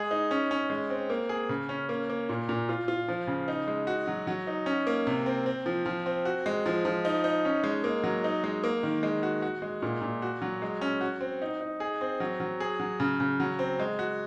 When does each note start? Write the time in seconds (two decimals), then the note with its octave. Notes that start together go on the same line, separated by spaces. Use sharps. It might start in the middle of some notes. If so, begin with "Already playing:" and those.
Already playing: G#3 G#4
0.11 D#4
0.31 C#4
0.51 C#4
0.70 G#3
0.90 C4
1.10 A#3
1.29 G#4
1.49 C#3
1.69 C#4
1.89 A#3
2.10 A#3
2.29 A#2
2.49 A#2
2.69 F4
2.88 F4
3.08 F3
3.27 C#3
3.48 D#4
3.68 G#3
3.87 F#4
4.07 F#3
4.27 F#3
4.47 D#4
4.66 C#4
4.87 A#3
5.07 C3
5.26 C4
5.46 C4
5.66 F3
5.86 F3
6.06 C4
6.25 F#4
6.46 G#3
6.66 F3
6.85 F3
7.05 D#4
7.24 D#4
7.45 C#4
7.64 G#3
7.84 A#3
8.04 F#3
8.24 D#4
8.44 G#3
8.64 A#3
8.83 D#3
9.03 G#3
9.23 F#4
9.42 F#4
9.62 G#3
9.82 A#2
10.02 A#2
10.22 F#4
10.42 F#3
10.62 G#3
10.81 C#4
11.01 F#4
11.21 C4
11.42 D#4
11.61 D#4
11.80 G#4
12.01 C4
12.20 F#3
12.40 F#3
12.60 G#4
12.80 F#3
13.00 C#3
13.20 C#3
13.40 F#3
13.59 C4
13.80 G#3
13.99 F#4